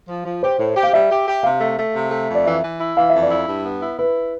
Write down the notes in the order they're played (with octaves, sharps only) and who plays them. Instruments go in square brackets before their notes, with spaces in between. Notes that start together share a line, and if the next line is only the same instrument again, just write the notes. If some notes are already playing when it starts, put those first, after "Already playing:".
[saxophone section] F3
F3
[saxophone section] G4 [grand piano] C5
[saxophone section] A2
G4
[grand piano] F5
[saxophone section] G3 [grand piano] E5
[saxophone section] G4
G4
[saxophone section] C3 [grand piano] F5
[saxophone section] A3
A3
C3
A3
F2
[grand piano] D5
[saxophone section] E3 [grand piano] E5
[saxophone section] E3
E4
[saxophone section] E3 [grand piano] F5
[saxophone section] F2 [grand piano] E5
[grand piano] D5
[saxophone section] E4
G2
B3
E4
[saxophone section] E4 [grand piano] B4